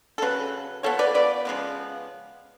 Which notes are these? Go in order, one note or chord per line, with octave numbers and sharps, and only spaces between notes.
A4
C#3 F#3 B4
F3 B3 A4 C#5
B4 D5
B4 D5
C#3 F3 G#3 B3